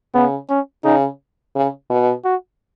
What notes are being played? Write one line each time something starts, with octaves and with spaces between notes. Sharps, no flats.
C#3 B3
C#4
C#3 D#4
C#3
B2
F#4